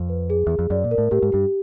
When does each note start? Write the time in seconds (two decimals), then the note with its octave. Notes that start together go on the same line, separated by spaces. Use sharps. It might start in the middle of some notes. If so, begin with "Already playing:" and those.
Already playing: F2
0.09 B4
0.30 G#4
0.47 E2 G#4
0.59 F2
0.70 F#2 D5
0.84 A#2
0.91 A#4
0.98 A2
1.11 A2 G4
1.23 G#2
1.32 G2 G4